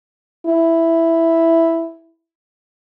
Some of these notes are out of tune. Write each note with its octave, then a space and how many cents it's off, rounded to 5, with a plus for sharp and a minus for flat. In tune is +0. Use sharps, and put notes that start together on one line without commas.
E4 +0